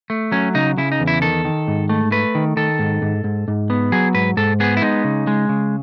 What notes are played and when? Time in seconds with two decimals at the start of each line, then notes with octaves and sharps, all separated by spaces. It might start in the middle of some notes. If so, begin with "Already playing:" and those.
0.10 A3
0.32 F#3 C#4
0.54 C#3 D#4
0.78 C#3 E4
0.92 D#4
1.00 E2
1.07 E4
1.22 D#3 A4
1.45 D#3
1.68 G#2
1.89 A3
2.12 A3 B4
2.35 D#3
2.57 D#3 A4
2.79 G#2
3.02 G#2
3.24 G#2
3.48 G#2
3.70 B3
3.92 F#3 G#4
4.14 G#2 B4
4.37 G#2 A4
4.60 B3 G#4
4.77 E4
4.82 G#3 D#4
5.04 C#3
5.27 G#3
5.49 C#3